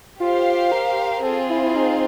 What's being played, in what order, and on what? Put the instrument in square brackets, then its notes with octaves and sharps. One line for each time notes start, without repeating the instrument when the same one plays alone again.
[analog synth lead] F4 [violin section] G4 C5 F5
[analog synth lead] A#4
[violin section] C4 F4 G#4 [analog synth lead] A4
[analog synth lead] E4
E4
D#4